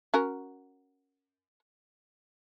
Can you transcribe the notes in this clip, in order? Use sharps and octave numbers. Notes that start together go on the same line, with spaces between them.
C#4 F#4 A#4